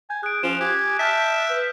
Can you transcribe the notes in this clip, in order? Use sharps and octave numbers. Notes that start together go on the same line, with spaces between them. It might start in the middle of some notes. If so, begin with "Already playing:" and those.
G#5 G6
G#4 F#6 D7
F3 C#4 E7
G4 G#5 D#6
E5 A5 F6 G6 B6
B4